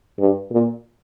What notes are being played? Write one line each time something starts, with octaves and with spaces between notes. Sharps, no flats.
G2
A#2